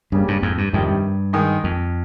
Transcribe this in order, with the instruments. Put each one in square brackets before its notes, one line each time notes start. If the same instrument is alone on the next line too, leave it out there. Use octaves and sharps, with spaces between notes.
[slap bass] G2 [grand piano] C#3 G3 A#3
[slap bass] G2
F2 G#2
G2
[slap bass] F2 G#2 [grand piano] C3 D#3 G3
[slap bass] G2
[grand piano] D#3 G#3 D#4
[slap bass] F2